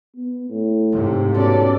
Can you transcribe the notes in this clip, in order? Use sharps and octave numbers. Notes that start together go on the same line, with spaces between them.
B3
A2
G#2 C3 A3
B2 C#4 A4 D5